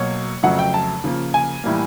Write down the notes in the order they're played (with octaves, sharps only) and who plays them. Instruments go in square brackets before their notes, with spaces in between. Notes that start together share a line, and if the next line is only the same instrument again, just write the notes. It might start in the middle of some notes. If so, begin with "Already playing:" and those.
Already playing: [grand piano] B2 F#3 A#3 C#5
F2 C#3 F#3 A3 F#5
G5
A5
C#3 F3 A#3
G#5
A2 E3 G3 A#3